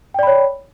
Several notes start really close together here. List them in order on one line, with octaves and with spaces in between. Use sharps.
G5 D5 B5 C#5